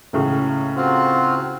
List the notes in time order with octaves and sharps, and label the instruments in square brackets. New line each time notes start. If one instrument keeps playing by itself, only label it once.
[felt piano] C#2 A2 C#3
[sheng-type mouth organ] C4 F4 F#4